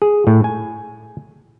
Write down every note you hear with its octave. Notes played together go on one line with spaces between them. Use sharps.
G#4
A2
G#5